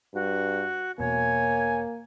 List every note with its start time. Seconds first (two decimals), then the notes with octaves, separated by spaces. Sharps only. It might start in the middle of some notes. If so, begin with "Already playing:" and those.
0.14 G2 F#4
0.99 E1 B2 A#3 C#5 G#5